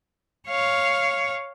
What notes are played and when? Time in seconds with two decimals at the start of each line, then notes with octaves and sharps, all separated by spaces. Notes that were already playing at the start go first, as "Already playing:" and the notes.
0.48 C#5 F5